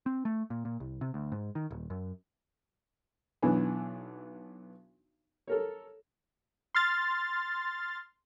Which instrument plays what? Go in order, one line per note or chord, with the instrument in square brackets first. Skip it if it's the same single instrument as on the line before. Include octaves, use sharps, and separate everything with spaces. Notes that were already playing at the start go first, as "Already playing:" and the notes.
[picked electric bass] C4
A3
A#2
A#2
C2
C3
D2
G#2
D#3
D#1
F#2
[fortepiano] B1 E3 B3 D4 G#5
A4 A#4 C#5
[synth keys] C6 F6 A6